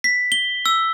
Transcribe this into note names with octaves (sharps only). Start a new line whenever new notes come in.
B6
G7
E6